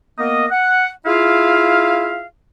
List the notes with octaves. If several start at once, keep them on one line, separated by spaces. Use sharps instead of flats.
A#3 B3 A#4 D#5
F#5
E4 F4 G#4 E5 F5